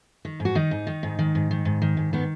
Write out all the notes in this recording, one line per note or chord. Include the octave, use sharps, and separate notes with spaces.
D#3
G#2
F#4
D#3 D#4
G#2
D#3
G#2
D#3
G#2
D#3
G#2
D#3
G#2
D#3 B3